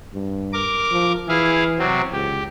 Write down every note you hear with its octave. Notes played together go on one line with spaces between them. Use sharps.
G2
A#4 D6
F3
E3 E4 G#4 F5
C3 F#3 C4
C#2 G4